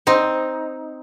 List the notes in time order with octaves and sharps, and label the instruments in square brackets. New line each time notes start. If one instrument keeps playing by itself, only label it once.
[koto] C4 D#4